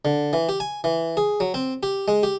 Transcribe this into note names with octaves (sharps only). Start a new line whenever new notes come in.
D3
E3
G4
G#5
E3
G#4
F#3
C4
G4
G#3
G4